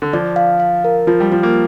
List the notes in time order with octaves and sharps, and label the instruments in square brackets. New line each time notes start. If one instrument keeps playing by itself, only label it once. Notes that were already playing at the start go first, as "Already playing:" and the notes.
[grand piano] D3
[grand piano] F3 [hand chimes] D5
[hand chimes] F5
F5
A#4
[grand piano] F3 [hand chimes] F4
[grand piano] G3
[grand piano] F3 [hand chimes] F4
[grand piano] A#3